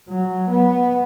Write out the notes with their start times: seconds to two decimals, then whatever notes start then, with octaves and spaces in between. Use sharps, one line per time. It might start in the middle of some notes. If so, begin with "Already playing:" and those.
0.09 F#3
0.50 B3